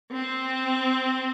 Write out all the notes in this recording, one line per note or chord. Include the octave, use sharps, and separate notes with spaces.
C4